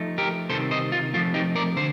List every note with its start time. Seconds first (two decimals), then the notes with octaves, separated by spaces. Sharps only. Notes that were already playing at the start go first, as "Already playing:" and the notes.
Already playing: F3 A3 D#4
0.18 G4 A#4
0.49 C3 D#3 G3 C4 A4 C5
0.71 C5 D#5
0.92 F4
1.14 F3 A3 C4 F4
1.34 D#4 G4
1.56 A#4 D5
1.77 D3 C5